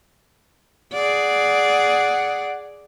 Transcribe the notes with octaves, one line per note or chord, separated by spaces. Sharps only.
G#4 D5 F#5